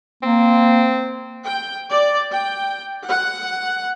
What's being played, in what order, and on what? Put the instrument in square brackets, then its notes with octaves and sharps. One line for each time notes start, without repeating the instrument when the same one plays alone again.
[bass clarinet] A#3 [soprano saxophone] C4
[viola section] G5
D5
G5
F#5